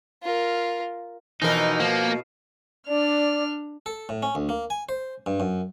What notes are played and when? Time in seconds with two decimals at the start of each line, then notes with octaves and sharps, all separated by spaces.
0.23 F4 A#4
1.42 B2 E3 F3 D#4 A#4
1.80 F3 A#3
2.88 D4 D5 F6
3.86 A4
4.09 A2
4.23 C#4
4.35 D2
4.49 A#3
4.70 G#5
4.89 C5
5.26 G2
5.40 F#2